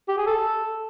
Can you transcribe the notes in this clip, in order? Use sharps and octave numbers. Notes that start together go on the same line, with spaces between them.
G4
G#4
A4